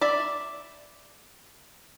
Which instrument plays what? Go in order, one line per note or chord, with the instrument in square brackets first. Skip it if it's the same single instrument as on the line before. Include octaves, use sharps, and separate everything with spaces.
[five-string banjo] D5 E5 B5